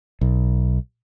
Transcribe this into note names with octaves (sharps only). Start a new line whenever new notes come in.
B1